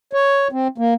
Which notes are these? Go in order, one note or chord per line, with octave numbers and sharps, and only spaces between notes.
C#5
C4
A#3